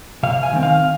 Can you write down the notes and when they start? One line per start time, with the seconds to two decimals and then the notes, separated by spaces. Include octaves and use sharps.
0.23 C3 F5
0.43 G#5
0.53 D#3 G#3 C4
0.63 F5